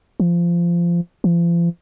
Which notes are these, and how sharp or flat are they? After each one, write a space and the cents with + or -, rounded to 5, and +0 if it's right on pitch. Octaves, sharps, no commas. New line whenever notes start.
F3 -20
F3 -40